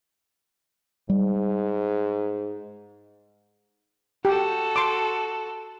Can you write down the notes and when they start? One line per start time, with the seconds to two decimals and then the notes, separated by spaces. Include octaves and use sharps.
1.09 G#2 G3
4.25 F#4 G4 A4
4.76 C6 D6